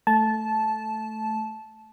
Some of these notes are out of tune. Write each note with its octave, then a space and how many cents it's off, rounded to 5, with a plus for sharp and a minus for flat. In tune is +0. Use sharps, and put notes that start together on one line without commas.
A3 -5 A5 -15